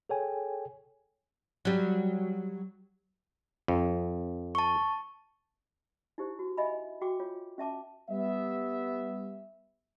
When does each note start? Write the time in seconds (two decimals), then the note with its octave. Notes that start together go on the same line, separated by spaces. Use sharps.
0.09 G#4 A4 C#5 G5 G#5
1.65 F#3 G3
3.68 F2
4.55 A5 C#6
6.18 D#4 E4 G4 C5
6.39 F#4
6.57 D#5 E5 G#5 B5
7.01 F#4 G5 D6
7.20 F4 C#5
7.58 C#4 E5 A5 D6
8.10 G3 B3 E5